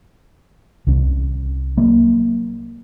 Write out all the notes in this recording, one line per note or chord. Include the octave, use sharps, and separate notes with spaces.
C2 C#4
F#3 A#3